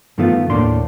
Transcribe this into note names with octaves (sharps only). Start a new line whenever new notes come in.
G2 D#3 F3 A3 B3 F4
D#2 A2 A3 A#3 D4 C6